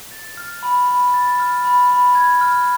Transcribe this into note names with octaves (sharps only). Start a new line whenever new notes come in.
A6
F6
B5
B5
A6
F6
B5
B5
G#6
F6